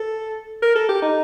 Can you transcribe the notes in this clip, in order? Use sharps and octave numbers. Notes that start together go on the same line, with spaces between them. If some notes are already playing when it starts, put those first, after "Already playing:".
Already playing: A4
A#4
A4
G4
D#4